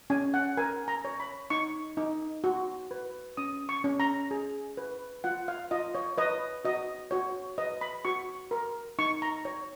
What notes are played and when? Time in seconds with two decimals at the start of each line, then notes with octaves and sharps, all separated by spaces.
0.10 C#4 G#5
0.34 F#5
0.57 A#4 G#5
0.88 A#5
1.05 C#5
1.20 B5
1.50 D#4 C#6
1.97 D#4
2.44 F#4
2.91 B4
3.37 C#4 D#6
3.69 C#6
3.84 C#4
4.00 A#5
4.31 G#4
4.77 B4
5.24 F4 F#5
5.48 F5
5.71 F4 D#5
5.95 C#5
6.18 B4 D#5
6.65 F#4 D#5
7.11 F#4 C#5
7.58 B4 D#5
7.81 B5
8.05 F#4 C#6
8.51 A#4
8.99 D#4 C#6
9.22 A#5
9.45 C#5